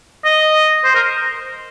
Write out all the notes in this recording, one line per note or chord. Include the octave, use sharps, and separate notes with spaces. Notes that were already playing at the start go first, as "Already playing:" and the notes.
D#5
C5
A#4